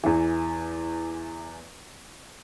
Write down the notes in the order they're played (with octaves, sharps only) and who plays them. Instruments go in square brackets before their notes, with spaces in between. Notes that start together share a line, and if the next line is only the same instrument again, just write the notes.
[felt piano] E2 E3